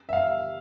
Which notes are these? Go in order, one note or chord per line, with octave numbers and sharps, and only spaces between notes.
E5
F5